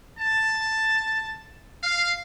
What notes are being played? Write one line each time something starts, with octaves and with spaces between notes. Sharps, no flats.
A5
F5